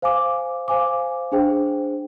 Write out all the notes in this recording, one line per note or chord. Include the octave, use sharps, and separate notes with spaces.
C5 F5 G#5 D6
C5 F5 G#5 D6
D4 G#4 C5 G5